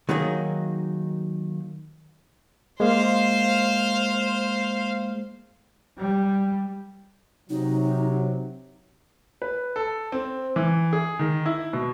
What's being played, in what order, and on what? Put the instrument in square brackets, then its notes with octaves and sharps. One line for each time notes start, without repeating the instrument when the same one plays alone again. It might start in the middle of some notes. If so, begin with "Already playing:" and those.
[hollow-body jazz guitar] D#3 F#3 A#3 D#4 F#4 G#4
[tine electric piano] G#3 A#3 [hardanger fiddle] C5 F5
[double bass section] G3
[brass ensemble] C3 F#3 [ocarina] D#4
[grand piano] B4
A4
C4
E3
G#4
D#3
E4
B2